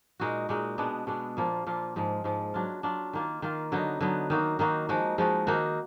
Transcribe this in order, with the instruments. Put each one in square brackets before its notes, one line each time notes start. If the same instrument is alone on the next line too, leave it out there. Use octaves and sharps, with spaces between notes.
[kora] A#2 G#3 D#4 F#4
A#2 G#3 D#4 F#4
B2 G#3 B3 D4
B2 G#3 B3 D4
A#2 F3 A#3 F4
A#2 F3 A#3 F4
G#2 F3 G#3
G#2 F3 G#3
F#3 D4 F4
F#3 D4 F4
D#3 A#3 F4
D#3 A#3 F4
D3 F#3 B3 D#4
D3 F#3 B3 D#4
D#3 A#3 D#4 F#4
D#3 A#3 D#4 F#4
F3 G#3 D#4 F#4
F3 G#3 D#4 F#4
D#3 A#3 D#4 F#4